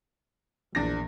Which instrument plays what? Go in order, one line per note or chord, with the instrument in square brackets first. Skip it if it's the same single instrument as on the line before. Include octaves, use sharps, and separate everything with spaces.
[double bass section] A#1 [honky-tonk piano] E2 D4 A#6